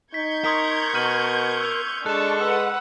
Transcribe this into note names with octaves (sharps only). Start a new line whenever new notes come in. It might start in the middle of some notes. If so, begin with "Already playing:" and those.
D#4 C#6 G6 G#6 B6
A#4 C6 D#6 B6
B2 F6 D#7 F#7
E6 F7
G#3 D4 A4 A5 C#6 F#6 E7
B4 F#5 E6